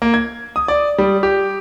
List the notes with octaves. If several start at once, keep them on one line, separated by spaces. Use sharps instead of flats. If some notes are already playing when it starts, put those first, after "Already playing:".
A#3
G#6
D#6
D5
G3
G4